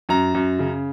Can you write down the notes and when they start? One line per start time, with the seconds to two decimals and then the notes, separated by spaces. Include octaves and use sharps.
0.09 F#2 A#5
0.34 F#2
0.59 C#3